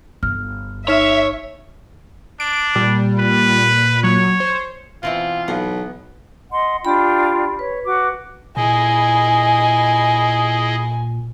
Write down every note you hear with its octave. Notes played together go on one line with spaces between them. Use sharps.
G1 F6
D#4 C#5 E5 F6 E7
D4 D7
A#2 G3
B4
F#3 C#5
C5
B2 E3 C4 F4
B1 B3
D#5 F#5 C6
D4 F4 G4 G5 B5
B4 C#5
F#4 D6
A#2 E4 G#4 D#5 G#5